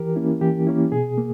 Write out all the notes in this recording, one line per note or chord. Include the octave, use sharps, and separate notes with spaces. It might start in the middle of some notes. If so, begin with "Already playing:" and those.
Already playing: E3 G4 A#4
A#3 C#4 E4
E3 G4
A#3 C#4 E4
B2 G#4
A#3